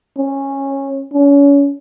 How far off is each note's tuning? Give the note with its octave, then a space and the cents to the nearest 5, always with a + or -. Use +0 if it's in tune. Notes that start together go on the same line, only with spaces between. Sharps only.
C#4 -15
C#4 +30